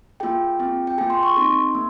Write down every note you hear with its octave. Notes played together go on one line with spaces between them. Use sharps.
A#3 F4 G#4 G5
C4 F4 G#4
G5
A#3 F4 G#4 G#5
C6
C#6
C4 D#4 G#4 C6
A#3